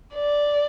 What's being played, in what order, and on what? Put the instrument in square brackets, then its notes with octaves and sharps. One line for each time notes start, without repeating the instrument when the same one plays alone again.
[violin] D5